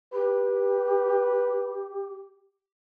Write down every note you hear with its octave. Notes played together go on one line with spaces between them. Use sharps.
G4 B4